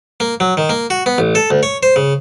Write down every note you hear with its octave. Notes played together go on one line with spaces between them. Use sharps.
A#3
F#3
D#3
A#3
F#4
B3
A1
A4
D2
C#5
C5
C#3